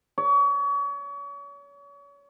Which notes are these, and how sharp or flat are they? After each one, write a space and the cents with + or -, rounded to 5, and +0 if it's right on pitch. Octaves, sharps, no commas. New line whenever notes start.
C#5 +35